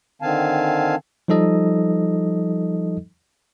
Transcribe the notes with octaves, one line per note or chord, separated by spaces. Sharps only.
D3 D#3 C4 F5 G#5 A5
F3 G3 D#4 A4 D#5